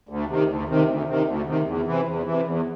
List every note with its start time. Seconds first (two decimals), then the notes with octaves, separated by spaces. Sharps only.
0.09 D2
0.28 C3 D#3
0.48 D2
0.68 C3 D#3
0.87 D2
1.07 C3 D#3
1.26 D2
1.46 C3 D#3
1.66 E2
1.85 C3 E3
2.06 E2
2.25 C3 E3
2.45 E2